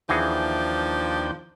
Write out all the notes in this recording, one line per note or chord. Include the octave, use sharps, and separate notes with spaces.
D#2 E3 F3 D4 F#4 G#4 G5